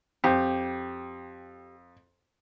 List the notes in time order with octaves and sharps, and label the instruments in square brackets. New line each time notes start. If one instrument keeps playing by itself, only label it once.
[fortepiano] F2 [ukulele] G4